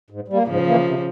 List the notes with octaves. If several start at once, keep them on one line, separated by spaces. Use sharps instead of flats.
G#2
G3
A#3
G#2 C#3 F3
E3 A#3
C3